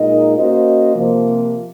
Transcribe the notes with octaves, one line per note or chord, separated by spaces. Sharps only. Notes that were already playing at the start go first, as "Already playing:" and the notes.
Already playing: A#2 G#3 D#4 A#4 D#5
A#3 C#4 F#4 C5 D#5
C3 F3 A#3